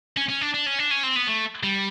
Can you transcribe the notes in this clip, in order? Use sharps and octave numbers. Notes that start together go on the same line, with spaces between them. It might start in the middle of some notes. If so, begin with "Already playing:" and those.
C#4
C#4
D4
D4
C#4
D4
C#4
C4
B3
A3
G3